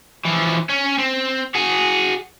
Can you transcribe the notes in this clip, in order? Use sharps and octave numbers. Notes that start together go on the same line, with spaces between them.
E3 F3
C#4
C4
F#4 G#4